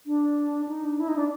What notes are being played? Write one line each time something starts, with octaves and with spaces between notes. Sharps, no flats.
D4
D#4
D4
E4
D#4
D4